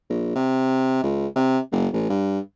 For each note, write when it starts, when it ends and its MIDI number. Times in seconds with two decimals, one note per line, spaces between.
0.10 0.35 34
0.35 1.01 48
1.03 1.27 37
1.36 1.59 48
1.72 1.88 30
1.93 2.08 33
2.09 2.39 43